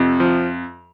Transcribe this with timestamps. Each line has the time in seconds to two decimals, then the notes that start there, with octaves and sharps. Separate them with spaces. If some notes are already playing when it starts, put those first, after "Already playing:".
Already playing: F2 C3
0.20 F3